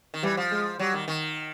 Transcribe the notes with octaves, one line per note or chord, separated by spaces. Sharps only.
D#3
E3 G3
F3
G#3
F#3 G3
D#3
D#3